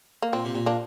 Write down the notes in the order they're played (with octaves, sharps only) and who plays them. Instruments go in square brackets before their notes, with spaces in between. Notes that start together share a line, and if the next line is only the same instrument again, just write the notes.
[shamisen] A#3
[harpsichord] A#2 [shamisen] C4
[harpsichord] C3
A#2
[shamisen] A#3 D4